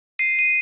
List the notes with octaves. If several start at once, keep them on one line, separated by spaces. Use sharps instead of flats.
C7 D#7
D#7